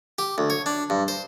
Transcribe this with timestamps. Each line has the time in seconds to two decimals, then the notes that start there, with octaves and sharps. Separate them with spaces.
0.19 G4
0.38 D2
0.50 C#5
0.66 D4
0.90 G2
1.08 C5